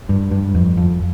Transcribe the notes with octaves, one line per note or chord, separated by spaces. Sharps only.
G2
G2
F2
F2